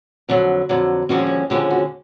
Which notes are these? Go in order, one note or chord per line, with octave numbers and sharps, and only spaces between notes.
F2 D3 F#3
F2 D3 F#3
D#2 D3 F3 G#3 C#4 F#4
F4
F#4
D#2 D3 F3 G#3 C#4 G4
F#4